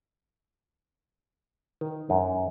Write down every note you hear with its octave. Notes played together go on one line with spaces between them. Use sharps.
D#3
F#2